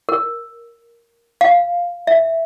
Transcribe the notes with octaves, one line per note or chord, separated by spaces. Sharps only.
A#4
F5
E5